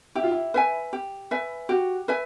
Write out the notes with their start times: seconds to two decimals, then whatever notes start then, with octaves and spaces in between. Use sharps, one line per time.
0.15 E4 G4
0.24 F4
0.31 E4
0.54 B4 E5 G#5
0.93 G4
1.31 B4 E5 G#5
1.69 F#4 G4
2.08 B4 E5 G#5